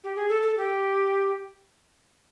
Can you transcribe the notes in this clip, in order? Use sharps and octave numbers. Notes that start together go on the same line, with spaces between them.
G4
G#4
A4
A4
G4